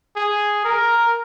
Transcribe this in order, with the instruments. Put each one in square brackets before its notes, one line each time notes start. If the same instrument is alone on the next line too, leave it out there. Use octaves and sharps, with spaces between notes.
[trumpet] G#4
A#4